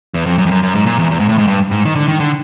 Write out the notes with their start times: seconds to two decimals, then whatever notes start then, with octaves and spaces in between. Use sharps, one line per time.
0.14 E2
0.26 F2
0.38 F#2
0.46 F2
0.51 F#2
0.63 F#2
0.75 G#2
0.86 A#2
0.99 E2
1.11 E2
1.20 G#2
1.29 A2
1.38 G#2
1.48 G2
1.71 G#2
1.85 D#3
1.95 D3
2.08 D#3
2.20 D3